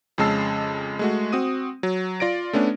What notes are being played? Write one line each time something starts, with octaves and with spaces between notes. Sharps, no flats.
F2 C#3 G#3 A5 E6 C7
G#3 A3 F#4
C4 F#4 D#6 D#7
F#3
F4 D5 A#6 D7
A3 B3 C#4 D4